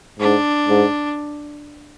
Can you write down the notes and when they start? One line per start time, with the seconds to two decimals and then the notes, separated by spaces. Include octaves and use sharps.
0.20 G#2 D4
0.69 G#2